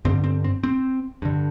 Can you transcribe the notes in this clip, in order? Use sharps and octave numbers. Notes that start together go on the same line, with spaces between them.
G2 D3 C4
C4
C4
C4
G2 D3